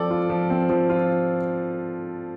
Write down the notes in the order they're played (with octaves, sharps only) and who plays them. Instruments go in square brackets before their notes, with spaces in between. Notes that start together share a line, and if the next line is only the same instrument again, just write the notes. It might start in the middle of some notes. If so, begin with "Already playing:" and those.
Already playing: [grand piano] F3 C4 A4 D5
F4
F3
C4
F3
F4